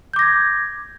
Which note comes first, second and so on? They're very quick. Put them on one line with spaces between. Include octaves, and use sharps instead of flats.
G6 D6 A#6 G#6